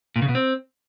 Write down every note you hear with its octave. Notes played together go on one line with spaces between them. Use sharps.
A#2
C#3
B2
C4